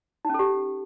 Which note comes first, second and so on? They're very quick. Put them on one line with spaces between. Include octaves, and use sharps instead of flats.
D#4 C#4 A4 G4